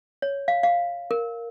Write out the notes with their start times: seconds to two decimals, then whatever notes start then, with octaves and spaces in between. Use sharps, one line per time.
0.22 C#5
0.48 F5
0.63 F5
1.11 A#4